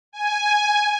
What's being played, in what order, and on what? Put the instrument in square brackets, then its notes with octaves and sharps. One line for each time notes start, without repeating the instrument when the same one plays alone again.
[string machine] G#5